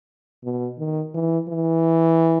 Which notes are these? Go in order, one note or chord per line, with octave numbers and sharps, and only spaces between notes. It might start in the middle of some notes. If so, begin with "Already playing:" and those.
B2
D#3
E3
E3